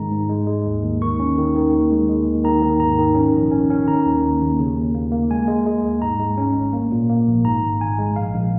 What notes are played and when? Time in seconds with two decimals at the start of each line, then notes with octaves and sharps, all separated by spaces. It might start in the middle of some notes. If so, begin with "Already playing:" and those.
Already playing: G#2 D#3 G#3 A#5
0.11 G#2
0.29 G#3
0.47 G#3
0.66 D#2
0.83 D#2
1.02 D#3 C#6
1.19 C#4
1.38 D#3
1.55 D#3
1.72 D#2
1.91 G#3
2.09 G#3
2.27 D#2
2.44 D#3 A#5
2.62 D#3
2.80 G#2 A#5
2.98 D#3
3.15 C#4
3.33 A#1
3.52 C#4
3.70 C#4
3.88 D#3 A#5
4.05 D#2
4.23 D#2
4.41 D#2
4.59 C#3
4.77 D#2
4.95 A#3
5.12 A#3
5.30 G#3 G#5
5.48 G#3
5.66 G#3
5.83 D#2
6.02 G#2 A#5
6.19 G#3
6.38 C#4
6.56 G#1
6.73 A#3
6.92 A#2
7.09 A#3
7.28 A#1
7.44 G#2 A#5
7.62 G#1
7.81 G#1 G#5
7.98 G#3
8.16 A#1 F5
8.34 A#1